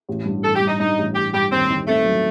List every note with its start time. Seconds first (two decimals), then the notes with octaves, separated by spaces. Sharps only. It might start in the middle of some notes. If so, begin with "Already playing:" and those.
0.09 A1
0.25 G2
0.44 A1 A4
0.56 G4
0.61 G2
0.68 D#4
0.80 G2 D#4
0.98 A1
1.15 A1 G4
1.34 G2 G4
1.52 D#2 C4
1.70 D#3
1.87 A3 C4
2.05 F#3